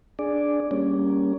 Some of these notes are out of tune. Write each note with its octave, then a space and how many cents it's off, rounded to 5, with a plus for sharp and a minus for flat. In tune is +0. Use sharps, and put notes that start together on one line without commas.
D4 +0 G#4 +0 D5 +0
G3 +0 A#3 +0 C#4 +15